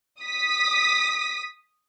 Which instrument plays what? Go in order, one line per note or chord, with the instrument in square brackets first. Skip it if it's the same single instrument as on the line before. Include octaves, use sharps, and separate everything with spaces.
[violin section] D#6 B6